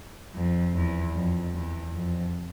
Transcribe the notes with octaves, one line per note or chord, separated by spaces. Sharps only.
F2
E2
F2
E2
F2